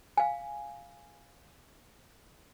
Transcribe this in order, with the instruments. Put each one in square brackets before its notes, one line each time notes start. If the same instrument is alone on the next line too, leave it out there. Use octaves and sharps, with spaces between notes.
[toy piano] F5 G#5